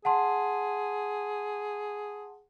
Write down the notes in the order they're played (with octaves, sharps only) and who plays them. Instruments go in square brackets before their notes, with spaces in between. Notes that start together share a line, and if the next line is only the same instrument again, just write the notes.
[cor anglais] G#4 [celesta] F#5 A5 C6